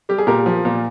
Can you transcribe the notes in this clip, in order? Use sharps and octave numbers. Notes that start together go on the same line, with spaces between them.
G3 G4
G#4
A#2 G4 A#4
F3
A#2